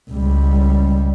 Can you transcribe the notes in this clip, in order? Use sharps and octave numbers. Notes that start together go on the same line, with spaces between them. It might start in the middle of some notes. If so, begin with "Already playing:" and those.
C#2 G3